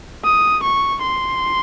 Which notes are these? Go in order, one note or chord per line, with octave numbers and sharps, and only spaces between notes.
D#6
C#6
C6